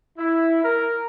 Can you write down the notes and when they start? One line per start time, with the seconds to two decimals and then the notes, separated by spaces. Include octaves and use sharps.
0.17 E4
0.64 A#4